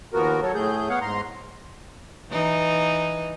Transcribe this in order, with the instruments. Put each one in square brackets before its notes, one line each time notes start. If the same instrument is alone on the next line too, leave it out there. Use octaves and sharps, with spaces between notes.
[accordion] D#2 F3 B3 F#4 A#4
F#3 A4 C#5
A2 A3 G#4 G6
B3 C#5 F5 F#5
G#2 A#5 C6
[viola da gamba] E3 D#4